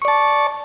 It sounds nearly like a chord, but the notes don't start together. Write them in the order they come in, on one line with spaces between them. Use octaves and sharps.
C#6 D5 A5